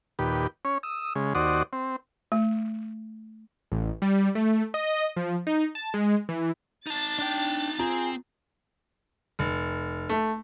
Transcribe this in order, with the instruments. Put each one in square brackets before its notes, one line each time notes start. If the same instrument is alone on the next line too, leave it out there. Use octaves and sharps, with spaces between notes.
[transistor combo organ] D#2 A#2 G4 B4
C#4 C#5
D#6 E6
C#3 G#3
D#2 F#4 C5 D5 D#6
C4
[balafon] A3
[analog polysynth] A1
G3
A3
D#5
F3
D#4
A5
G#3
E3
[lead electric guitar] D#4 A5 [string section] A6
[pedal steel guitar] D4 G5
[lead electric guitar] C4 [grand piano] F4 A#5 [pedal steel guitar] G#4
[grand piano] F1
A3